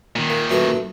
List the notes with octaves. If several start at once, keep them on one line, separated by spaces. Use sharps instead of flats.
A#2 D#3
A#3
F#2 A3 B4